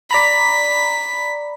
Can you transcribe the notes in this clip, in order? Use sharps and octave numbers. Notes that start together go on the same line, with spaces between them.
D5 A#5 B5 B6